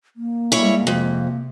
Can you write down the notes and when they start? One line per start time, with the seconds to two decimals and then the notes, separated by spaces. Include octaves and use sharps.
0.17 A#3
0.52 G3 G#3 E4 C#5
0.87 F2 C3